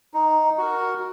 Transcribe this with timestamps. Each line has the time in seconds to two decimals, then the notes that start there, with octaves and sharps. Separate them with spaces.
0.14 D#4
0.58 F#4 A#4